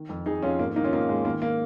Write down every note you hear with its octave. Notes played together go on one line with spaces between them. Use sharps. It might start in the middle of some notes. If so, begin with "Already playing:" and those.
Already playing: D#3
F2
F2 D#4 G#4
F2 C#4 F4
G#2 A#3
D#3 A#3 D#4
C#4 F4
G#2 A#3 D#4
G#2 G#3
D#3 A#3
A#3